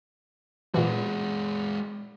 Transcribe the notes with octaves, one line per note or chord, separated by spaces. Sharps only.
A#2 E3 G#3 F#4